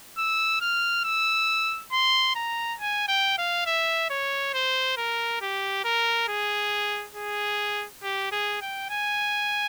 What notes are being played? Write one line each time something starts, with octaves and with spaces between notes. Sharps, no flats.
E6
F6
E6
C6
A#5
G#5
G5
F5
E5
C#5
C5
A#4
G4
A#4
G#4
G#4
G4
G#4
G5
G#5